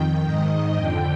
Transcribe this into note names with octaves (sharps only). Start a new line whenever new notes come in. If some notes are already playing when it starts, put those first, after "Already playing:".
Already playing: F2 D#3 G5
G#2 D#3 D#5
F2 D3 G5